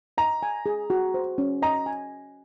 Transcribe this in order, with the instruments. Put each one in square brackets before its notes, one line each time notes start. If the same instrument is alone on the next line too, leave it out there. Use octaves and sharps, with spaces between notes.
[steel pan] D#5 [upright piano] A#5
[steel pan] G#5
G#4
F#4
C5
C#4
[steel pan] D#5 [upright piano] A#5
[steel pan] G#5